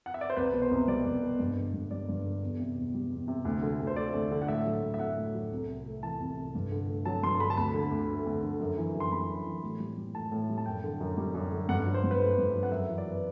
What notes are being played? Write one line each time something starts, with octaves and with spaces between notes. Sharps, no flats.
F#5
E5
D5
C5
C2 B4
B2
C5
C2
G3 D5
C2
B2
G2
D3
G2
G3 D5
G2
D3
E2
C3
E2
G3
E2
C3
D2
D3
D2
C5
A3 D5
D2
D3
F#5
A2 E5
F#3
A2
E5
A3 F#5
A2
F#3
C2
C3
A3
E3 A5
C2
C3
G2
D3
A3
F#3 A5
G2 C6
D3 B5
A5
D2 B5
D3
D2
A3
D2
D3
F#2
E3
F#2
C6
G3 B5
F#2
E3
A2
G3
G3
A2 A5
A2
G3
A5
F#2 G5
D3
F#2
G3
F#2
D3
G2 F#5
F#3
C5
G2
B4
A3 C5
G2
F#3
F#5
F#2 E5
E3
D5
F#2
B4